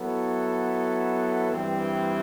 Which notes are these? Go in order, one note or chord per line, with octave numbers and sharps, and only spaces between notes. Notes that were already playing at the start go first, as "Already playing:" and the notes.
Already playing: F#3 B3 E4 A4
G2 E3 G3 C4